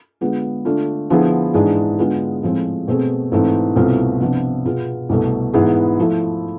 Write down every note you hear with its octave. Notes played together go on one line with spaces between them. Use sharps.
D3 G#3 B3 F4 G#4
D3 A3 D4 F4
D3 F3 B3 E4 G#4
G#2 E3 G#3 D4 G#4
D3 G#3 B3 F4 G#4
A2 F3 G#3 C4
B2 A3 C4 G#4
G#2 E3 A3 C4
C2 B2 A3 C4 F4
C3 F3 B3 D4
B2 B3 F4 G#4
C2 B2 A3
G#2 E3 B3 E4 G#4
F3 A3 E4